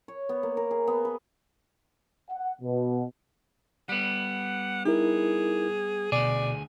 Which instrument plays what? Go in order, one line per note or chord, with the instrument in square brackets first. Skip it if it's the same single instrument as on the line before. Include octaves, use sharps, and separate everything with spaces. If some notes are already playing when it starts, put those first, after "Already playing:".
[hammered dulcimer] C#5
B3
A#3
A#4
G#4
B3
B4
[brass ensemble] F#5
B2
[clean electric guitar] G3 B3 [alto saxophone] F#5
[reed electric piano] D#4 E4 A#4 [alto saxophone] G#4
[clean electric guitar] D2 G#4 [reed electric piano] B2 [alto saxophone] D5